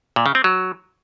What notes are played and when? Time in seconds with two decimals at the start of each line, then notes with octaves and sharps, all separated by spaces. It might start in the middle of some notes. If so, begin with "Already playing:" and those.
0.16 A#2
0.26 C#3
0.35 C4
0.44 F#3